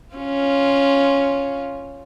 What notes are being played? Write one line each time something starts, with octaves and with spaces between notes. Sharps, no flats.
C#4 F4